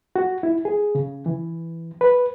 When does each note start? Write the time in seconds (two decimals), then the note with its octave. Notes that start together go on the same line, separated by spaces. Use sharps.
0.16 F#4
0.43 E4
0.65 G#4
0.95 C#3
1.26 E3
2.01 B4